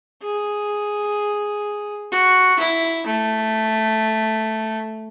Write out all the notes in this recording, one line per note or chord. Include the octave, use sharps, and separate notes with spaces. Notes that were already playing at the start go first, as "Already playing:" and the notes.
G#4
F#4
E4
A3